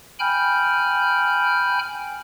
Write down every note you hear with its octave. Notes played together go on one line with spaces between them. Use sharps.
G5 G#5 B5 F6 G6